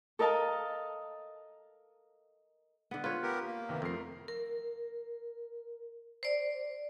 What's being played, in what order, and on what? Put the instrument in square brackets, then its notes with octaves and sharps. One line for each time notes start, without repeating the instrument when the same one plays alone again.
[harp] A4 A#4 D#5 F5 A5
[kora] D3 B3
[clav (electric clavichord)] F4 [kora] B4 C#5
[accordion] B3 G4 A#4
A#3
[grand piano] C3 D#3 B3
[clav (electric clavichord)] F2 [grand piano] A3 A#4 C7
[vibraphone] A#4
C5 D5